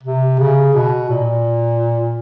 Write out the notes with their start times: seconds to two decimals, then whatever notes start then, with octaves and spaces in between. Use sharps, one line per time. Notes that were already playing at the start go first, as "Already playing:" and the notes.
0.03 C3
0.39 C#3
0.74 B2
1.09 A#2